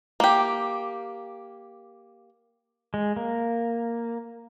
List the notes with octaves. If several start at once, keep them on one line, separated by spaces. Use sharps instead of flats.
A#3 G4
G#3
A#3